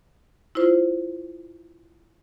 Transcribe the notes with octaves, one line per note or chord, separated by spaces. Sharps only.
E4 F4 C5